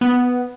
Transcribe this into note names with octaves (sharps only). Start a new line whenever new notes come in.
B3